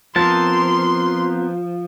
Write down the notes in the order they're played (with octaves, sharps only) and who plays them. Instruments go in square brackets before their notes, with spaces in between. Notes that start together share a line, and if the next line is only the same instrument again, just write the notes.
[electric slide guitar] F3 [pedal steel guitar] B3 C4 A#4 [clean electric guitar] A5 [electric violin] C6